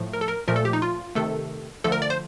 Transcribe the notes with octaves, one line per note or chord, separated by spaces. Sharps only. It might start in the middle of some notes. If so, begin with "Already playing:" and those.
Already playing: A2 F3 A3
A#4
A4
A#4
A#2 F3 A3 A#4
A4
G4
D#4
F4
C3 D#3 A3 A4
D3 F3 A3 A4
A#4
D5
C5